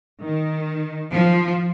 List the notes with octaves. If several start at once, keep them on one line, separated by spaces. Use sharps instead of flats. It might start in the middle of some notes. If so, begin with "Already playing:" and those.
D#3
F3